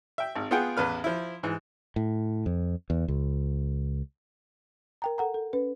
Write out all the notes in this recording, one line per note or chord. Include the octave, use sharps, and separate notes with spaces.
E5 G5
G#1
B3 F4 G#4 F#5 G5
A1 E2 B4 F6
F3 E4
G#2 E3
A2
F2
E2
C#2
A#4 G5 A#5
A4 F#5 A#5
A4
C#4 B4